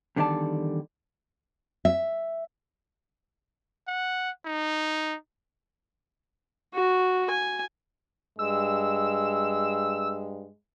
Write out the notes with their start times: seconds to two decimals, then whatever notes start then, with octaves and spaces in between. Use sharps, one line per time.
0.16 E2 D3 D#3 G3 D5 A5
1.85 E5
3.88 F#5
4.46 D#4
6.74 F#4
7.30 G#5
8.39 G2 G#3 E6